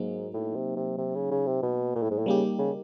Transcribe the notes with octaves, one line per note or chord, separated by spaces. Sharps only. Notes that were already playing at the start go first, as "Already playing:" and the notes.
Already playing: G#2 F#3 A#3 D#4
A2
C3
C3
C3
C#3
C#3
C3
B2
A#2
A2
G#2
A2
C#3 G3 A#3 D#4 G4
C#3